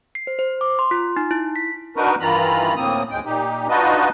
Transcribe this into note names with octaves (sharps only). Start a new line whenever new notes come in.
C7
C5
C5
D6
C6
F4
D#4
E4
B6
D4 D#4 F#4 A#4 B4
G2 D#3 E3 F4 A#5 B5
D2 A2 A#3 C4 D#6
D2 G#2 G#3 G5
A#2 D#4 G4
D4 D#4 F4 F#4 B4 D#5